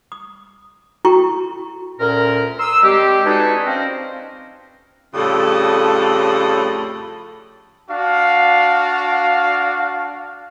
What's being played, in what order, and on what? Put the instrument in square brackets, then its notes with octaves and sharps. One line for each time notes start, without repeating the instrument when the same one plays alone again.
[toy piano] D#6
E4 F#4 A4 G5 A#5 C#6
[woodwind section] D2 A#2 C#4 A#4
A#5 C6 D#6 E6
G3 G#3 C4 G4
D4 D#4 F#4 G#4 A4 B4
F3 C4 C#4 A#4 C5 D#5
[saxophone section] F2 A2 C#3 G3 F4 A4
[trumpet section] D4 F#4 F5